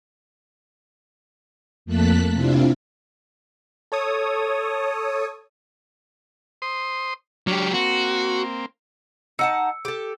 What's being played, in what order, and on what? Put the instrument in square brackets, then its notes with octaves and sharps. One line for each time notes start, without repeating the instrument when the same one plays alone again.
[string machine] F2 A3 A#3 A5 F#6 B6
C3 C4 D4 E4 F4
[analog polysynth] A4 C#5 D#6
[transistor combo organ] C5 C6 D#6
[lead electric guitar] F#3 G4 [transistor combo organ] D4 C#5 F6
[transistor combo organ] A#3 C4 [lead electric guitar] F#4
[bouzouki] D#4 F#5 A5 [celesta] E6 C#7
[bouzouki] G4 A4